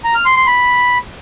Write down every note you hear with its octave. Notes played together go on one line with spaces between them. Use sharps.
A#5
F6
C6
C6
B5